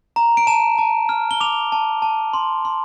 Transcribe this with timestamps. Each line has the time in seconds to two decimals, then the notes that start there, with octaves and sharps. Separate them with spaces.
0.16 A#5
0.37 D7
0.47 A5 E7
0.78 A5
1.09 F6
1.31 G7
1.40 D6 F7
1.72 A5
2.02 A5
2.33 C6
2.65 C6